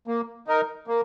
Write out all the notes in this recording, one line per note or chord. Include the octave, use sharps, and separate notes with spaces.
A#3
D#4 A#4
A#3